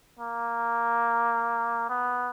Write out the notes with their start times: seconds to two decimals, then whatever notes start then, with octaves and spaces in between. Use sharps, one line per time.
0.19 A#3
1.89 B3